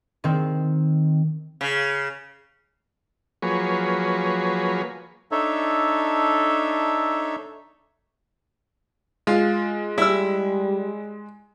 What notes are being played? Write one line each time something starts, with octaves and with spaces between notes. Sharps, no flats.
D#3 C4
C#3
F3 F#3 A#3 G#4 B4 C#5
D4 D#4 A4 C#5 E5
G#3 F4
G3 E4 E6